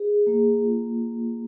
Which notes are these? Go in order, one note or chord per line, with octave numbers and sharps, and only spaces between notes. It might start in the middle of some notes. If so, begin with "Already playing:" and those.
Already playing: G#4
A#3
F4